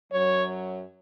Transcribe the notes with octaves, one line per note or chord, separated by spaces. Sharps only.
F#2 F#3 C#5